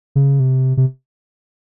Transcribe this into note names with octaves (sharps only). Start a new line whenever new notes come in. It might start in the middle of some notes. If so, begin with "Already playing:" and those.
C#3
C3
C3